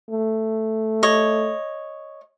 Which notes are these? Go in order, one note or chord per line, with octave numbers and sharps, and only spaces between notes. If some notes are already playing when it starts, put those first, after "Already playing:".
A3
C#5 D#5